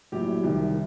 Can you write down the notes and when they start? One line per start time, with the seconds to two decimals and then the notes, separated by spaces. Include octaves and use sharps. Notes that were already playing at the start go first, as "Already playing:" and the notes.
0.12 A#1 A2 F#3 G4
0.43 C2 C3 D#3